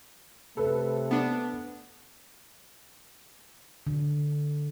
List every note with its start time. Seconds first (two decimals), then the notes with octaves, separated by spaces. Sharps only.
0.57 C3 A3 A4 B4
1.11 B3 D4
3.87 D3